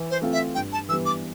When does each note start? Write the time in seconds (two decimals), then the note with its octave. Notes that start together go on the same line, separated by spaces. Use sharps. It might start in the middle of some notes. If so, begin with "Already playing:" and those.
Already playing: E3
0.10 C5
0.22 A3 C4 F4
0.33 E5
0.55 G2 G5
0.73 A5
0.89 E3 G3 B3 E6
1.06 D6